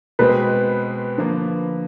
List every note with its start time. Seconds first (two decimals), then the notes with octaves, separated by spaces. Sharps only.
0.19 B2 G#3 C4 B4
1.17 D3 F3 A#3